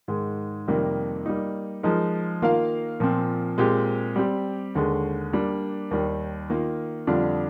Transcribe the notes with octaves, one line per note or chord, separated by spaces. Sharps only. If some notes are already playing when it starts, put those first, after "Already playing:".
G#2 D#3 G#3
F2 C3 D#3 G3 A#3
G3 A#3 D#4
F3 G#3 D#4 A#4
D#3 A#3 F4 A#4 F5
A#2 F3 C4
A#2 G#3 C4 G4
G3 C4 G4
D#2 D3 G#3
G3 A#3 D4
D#2 D#3 G3
D#3 A#3 F4
F2 D3 G3 D4 F4